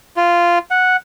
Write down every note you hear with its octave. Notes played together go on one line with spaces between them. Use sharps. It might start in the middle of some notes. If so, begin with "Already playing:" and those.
F4
F#5